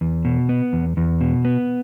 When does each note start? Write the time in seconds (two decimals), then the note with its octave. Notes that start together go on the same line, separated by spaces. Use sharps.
0.01 E2
0.25 B2
0.49 B3
0.73 E2
0.97 E2
1.21 B2
1.45 B3